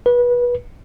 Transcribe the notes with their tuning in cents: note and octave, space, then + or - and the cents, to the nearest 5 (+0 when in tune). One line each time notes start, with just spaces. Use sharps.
B4 -25